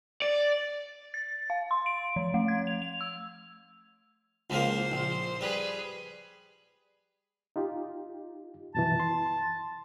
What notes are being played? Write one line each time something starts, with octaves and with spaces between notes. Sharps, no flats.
D5
A6
F5
C6
D7
F3
A3
G#6
F7
F7
E6
C#2 F3 A#3 C5
A#1
G3 G#4 B4
D#4 F4 G4
F#2 B2 E3 A5
C6